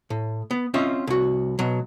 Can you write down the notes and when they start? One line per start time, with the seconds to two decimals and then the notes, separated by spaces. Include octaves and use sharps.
0.10 A2
0.51 B3
0.74 C4 C#4 F4 D#5 E5
1.07 C2 F#4
1.59 B2 F#3